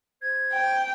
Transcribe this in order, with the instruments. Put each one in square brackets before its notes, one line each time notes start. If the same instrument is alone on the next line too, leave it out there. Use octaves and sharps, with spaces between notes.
[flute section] C5 G#6
[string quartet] G5